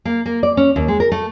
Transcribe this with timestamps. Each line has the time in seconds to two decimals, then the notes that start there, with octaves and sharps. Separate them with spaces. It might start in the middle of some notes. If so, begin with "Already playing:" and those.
0.05 A#3
0.26 A#3
0.43 D5
0.57 C#4
0.76 D#2
0.88 G#3
1.00 A#4
1.12 A3